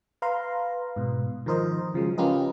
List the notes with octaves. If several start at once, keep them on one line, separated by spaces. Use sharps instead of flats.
B4 F5 A#5 C6
G#2 B2
D#3 F3 A#4 C5 D#5
C#3 F3 F#3 G#3
C#4 F4 G4 A#4 B4 D#5